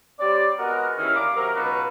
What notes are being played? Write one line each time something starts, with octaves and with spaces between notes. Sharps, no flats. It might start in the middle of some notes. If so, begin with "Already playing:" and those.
G3 C4 C#5 D5
G#3 B3 F#4 A#4
D#2 D#3 C#4 E4 F6
D5 F5 A#5 D6
C3 F#3 G4 A#4
C#2 B2 D#4 F4 F#4 B4